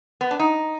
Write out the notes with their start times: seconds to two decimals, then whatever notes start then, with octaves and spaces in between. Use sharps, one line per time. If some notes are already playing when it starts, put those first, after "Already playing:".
0.21 B3
0.31 D4
0.39 D#4